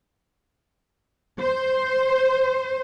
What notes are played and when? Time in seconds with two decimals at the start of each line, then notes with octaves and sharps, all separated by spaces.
1.39 C5